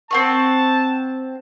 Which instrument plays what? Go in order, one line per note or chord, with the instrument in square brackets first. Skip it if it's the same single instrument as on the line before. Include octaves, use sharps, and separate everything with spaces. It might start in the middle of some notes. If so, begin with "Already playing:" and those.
[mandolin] C4 F#5 C#6 [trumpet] A5